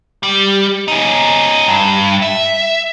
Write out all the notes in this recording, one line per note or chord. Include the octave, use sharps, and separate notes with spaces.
G3
C#4 D#4
G2
E5